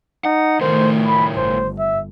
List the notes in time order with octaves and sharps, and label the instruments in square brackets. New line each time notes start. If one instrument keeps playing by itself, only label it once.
[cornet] D#4 [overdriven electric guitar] F#5
[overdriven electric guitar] A2 A#4 [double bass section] D#3 A3 [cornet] C5
[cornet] B5
[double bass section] G1 [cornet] C5
[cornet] E5